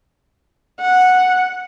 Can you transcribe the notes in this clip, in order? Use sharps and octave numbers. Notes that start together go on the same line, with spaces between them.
F#5